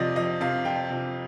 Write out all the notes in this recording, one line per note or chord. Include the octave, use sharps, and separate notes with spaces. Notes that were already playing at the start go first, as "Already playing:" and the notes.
Already playing: F2 C3 F3 D5 D#5
F2 D#5
C3 F3 F5
F2 G5
C3 F3